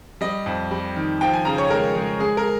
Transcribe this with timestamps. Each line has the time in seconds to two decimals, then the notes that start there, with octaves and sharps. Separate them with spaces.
0.21 G3 D#5
0.46 F2
0.71 G3
0.96 D#3
1.21 F3 G5
1.33 G#5
1.45 C#3 A#5
1.58 C#5
1.70 G#3 A#4
1.95 G#3
2.20 G#3 G#4
2.37 A#4